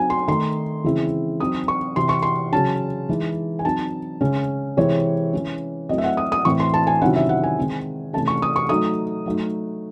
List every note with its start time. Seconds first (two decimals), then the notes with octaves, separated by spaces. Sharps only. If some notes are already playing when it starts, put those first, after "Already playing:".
Already playing: F#3 C4 D#4 G#5
0.10 C6
0.28 D#3 A3 D#4 C6
0.84 C#3 E3 G#3 C4 E4
1.40 F#3 C4 D#4 D#6
1.68 C#6
1.96 C3 E3 C4 E4 C6
2.09 C#6
2.23 C6
2.52 C#3 F#3 C#4 A5
3.09 E3 G#3 D#4
3.59 G#5
3.65 F#3 C4 D#4 A5
4.21 C#3 G#3 C#4
4.77 C3 E3 G#3 C4 C#5
5.33 E3 G#3 C#4
5.89 F#3 A3 C4 E4 D#5
5.98 E5
6.04 F#5
6.17 D#6
6.32 D#6
6.45 A2 E3 C4 C#6
6.60 C6
6.74 A5
6.87 G#5
7.02 C3 D#3 F#3 C#4 E4 F#5
7.16 E5
7.29 F#5
7.43 G#5
7.58 D#3 G#3 C4 D#4
8.13 C3 E3 A3 C#4 A5
8.28 C#6
8.42 D#6
8.56 C#6
8.69 F#3 A3 D#4 D#6
9.26 F#3 A3 D#4